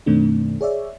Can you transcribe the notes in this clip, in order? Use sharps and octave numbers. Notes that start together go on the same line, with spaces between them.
F#2 B2 D#3 A3 C4 D4
G#4 C#5 D5 E5